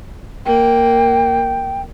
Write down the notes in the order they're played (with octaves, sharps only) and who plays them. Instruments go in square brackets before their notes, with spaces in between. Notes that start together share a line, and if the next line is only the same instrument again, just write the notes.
[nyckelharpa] A#3 [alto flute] G5